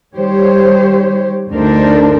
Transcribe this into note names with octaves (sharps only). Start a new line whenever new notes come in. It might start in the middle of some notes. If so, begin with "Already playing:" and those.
D#3 G3 G4 C5 C#5
D2 D4 D#4 A4 A#4 C5